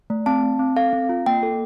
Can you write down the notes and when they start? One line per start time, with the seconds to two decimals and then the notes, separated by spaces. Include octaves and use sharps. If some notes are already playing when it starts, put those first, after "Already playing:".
0.10 A3
0.26 C4 A5
0.43 C4
0.59 C4
0.77 A4 F5
0.93 C4
1.09 F4
1.26 A#3 G5
1.43 A4